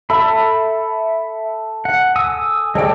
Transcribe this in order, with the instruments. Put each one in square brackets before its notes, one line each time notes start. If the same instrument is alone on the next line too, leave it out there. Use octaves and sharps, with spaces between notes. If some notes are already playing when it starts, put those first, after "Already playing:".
[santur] A4 [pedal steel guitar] E5 B5
[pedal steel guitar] F#5
G#5 D#6 E6
[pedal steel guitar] G#3 C#5 G5 [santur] A4 D5